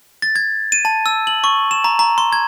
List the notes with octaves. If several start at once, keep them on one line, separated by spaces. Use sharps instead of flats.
A6
G#6
D#7
A5
E6
F#7
C#6
E7
A#5
A#5
C6
G#6